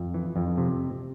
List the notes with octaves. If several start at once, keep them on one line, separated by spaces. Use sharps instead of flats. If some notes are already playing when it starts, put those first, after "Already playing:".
Already playing: F2
E3
F2
C3